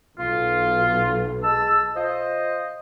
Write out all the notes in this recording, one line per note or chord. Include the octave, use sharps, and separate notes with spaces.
B1 F4
G#3 A5 E6
F4 C5 D#5